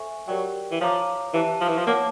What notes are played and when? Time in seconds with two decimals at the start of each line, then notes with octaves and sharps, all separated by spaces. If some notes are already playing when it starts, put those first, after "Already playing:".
Already playing: A4 C5 E5 G#5 C#6
0.28 F#3 G4 A#4 D5 G5
0.72 E3
0.81 F3 C#5 F5 A#5 D6
1.34 E3 G4 C5 E5 A5
1.61 F3
1.68 E3
1.77 F3
1.87 A#3 C#5 F#5 A5 D6